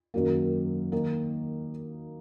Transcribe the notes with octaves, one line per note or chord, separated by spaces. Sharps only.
F#2 D#3 F#3 A#3
D#3 A#3 D#4